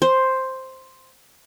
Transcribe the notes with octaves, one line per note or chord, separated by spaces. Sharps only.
C5